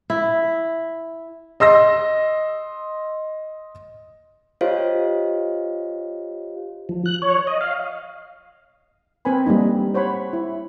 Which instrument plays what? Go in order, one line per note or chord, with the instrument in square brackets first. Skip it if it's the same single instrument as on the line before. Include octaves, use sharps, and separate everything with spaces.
[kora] E4
[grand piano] D#5 C6 E6 A#6
[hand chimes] F4 G4 C5 C#5 D#5 F5
[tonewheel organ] F3
F#6
C#5
D#5
F5
[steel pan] C4 A#4 B4 G#5 B5
G3 A3 A#3 D#4
C5 C#5 F#5 B5
E4